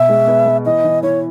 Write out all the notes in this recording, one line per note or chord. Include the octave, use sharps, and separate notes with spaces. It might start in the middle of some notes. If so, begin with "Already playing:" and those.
Already playing: B2 E5
G#3
B3
B3
E3 D#5
E3
E3 C#5